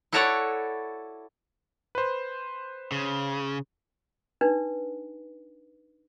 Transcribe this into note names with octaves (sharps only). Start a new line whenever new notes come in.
E4 F#4 A4 C#5 D5 F#5
B4 C5
C#3
D4 D#4 B4